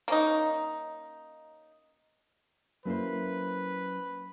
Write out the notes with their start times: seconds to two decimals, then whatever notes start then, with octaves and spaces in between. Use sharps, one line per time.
0.08 A#3 C#4 D#4
2.85 F#3 A#3 C#4 E4 B4 C5